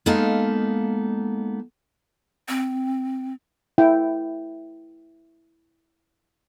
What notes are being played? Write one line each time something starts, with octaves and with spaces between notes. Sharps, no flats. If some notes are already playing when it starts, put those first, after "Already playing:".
G#3 A#3 B3 D#4 A4 F5
C4
E4 G5